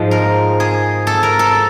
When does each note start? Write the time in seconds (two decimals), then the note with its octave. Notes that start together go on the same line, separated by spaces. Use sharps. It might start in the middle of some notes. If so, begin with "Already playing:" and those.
Already playing: G#2 F3 G#3
0.11 A#4
0.60 G#4
1.07 A4
1.23 A#4
1.39 A4